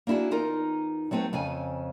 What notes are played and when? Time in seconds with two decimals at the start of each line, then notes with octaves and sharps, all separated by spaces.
0.07 A#3 D4 E4 F#4 G#4
0.31 E2 D#4 F4 A#4
1.11 F#3 A3 C4 B4 C#5
1.33 F2 C#3 C4 G#5